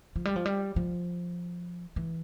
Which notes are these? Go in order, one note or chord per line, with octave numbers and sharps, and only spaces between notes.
F3
G3
F3
G3
F3
E3